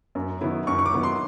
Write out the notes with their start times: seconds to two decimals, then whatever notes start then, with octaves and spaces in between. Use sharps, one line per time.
0.15 F#2
0.41 D#3 F#3 B3 E4
0.67 F#2 C#6
0.79 C#6
0.86 D6
0.94 D#3 F#3 B3 E4
1.03 C6